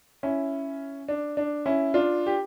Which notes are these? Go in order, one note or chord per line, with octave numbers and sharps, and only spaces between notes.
C#4 E4
D4
D4
C#4 E4
D4 F4
G4